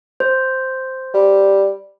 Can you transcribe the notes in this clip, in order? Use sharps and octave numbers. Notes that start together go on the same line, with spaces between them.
C5
G3